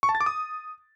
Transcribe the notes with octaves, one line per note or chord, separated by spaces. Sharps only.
C#6
A5
A6
D6
D#6